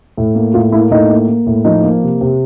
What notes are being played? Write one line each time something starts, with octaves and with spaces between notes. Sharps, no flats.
A2
A#3
A2 F4
A#3 E4
A2 D#4
A#3
A#3
A2
F3 D#4
A#3
C3
C3